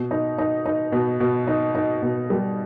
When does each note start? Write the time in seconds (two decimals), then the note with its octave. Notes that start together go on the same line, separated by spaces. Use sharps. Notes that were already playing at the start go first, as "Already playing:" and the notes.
Already playing: B2
0.11 D#4
0.38 D#4
0.66 D#4
0.92 B2
1.20 B2
1.47 D#4
1.75 D#4
2.02 B2
2.30 G3